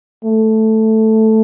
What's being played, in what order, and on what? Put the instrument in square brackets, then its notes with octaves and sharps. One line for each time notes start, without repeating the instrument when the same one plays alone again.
[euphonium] A3